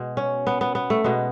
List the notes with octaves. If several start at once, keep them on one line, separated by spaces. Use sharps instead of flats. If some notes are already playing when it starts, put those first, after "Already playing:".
Already playing: B2 G#3
C#4
B3
B3
B3
A3
B2 G#3 B3